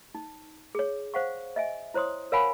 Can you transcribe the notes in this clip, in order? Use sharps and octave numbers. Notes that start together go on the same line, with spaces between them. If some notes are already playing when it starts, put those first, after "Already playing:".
D#4
G#4 C#5
C5 F5 F#5 C#6
D#5 E5 G#5
E4 C5 C#5 C6 D#6
A#4 C#5 F5 F#5 G#5 B5